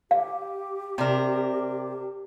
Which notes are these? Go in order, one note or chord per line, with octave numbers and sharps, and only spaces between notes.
G4 F5
C3 D4 A#4